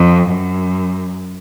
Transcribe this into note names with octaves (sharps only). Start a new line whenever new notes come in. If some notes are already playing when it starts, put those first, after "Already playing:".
Already playing: F2
F#2